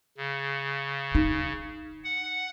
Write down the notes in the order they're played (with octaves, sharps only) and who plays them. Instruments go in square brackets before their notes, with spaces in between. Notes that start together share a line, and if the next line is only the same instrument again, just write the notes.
[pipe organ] C#3
[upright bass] D#4
[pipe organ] F#5